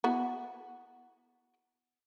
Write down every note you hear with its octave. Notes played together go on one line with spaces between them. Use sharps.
B3 E4 F#4